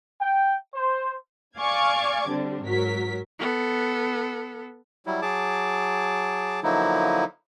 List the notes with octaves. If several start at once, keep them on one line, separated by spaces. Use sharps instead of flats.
G5
C5
D5 F5 G#5 C#6 D6 G#6
D3 G3 C4 D4
G#2 F#3 A#4 B6
B3 A4
F#3 G3 E4
F#3 G#4 A5 D6
D3 F3 F#3 A#3 D#4 E4